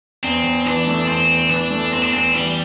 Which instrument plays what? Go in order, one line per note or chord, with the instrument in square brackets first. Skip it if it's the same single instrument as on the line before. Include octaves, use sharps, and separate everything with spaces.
[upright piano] E2 [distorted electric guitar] C4
[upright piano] E2
[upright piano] E3 [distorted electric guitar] D4
[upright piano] A3
[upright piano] E2 [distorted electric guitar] C4
[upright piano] E2
[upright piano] E3 [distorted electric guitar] D4
[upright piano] A3
[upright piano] E2 [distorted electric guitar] C4
[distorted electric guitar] D4
[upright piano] E2 [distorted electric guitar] C4
[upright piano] E3 [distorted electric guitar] G3